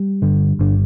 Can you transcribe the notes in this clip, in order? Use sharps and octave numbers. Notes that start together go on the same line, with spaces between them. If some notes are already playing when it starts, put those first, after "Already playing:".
Already playing: G3
G1 G2 D3
G1 G2 D3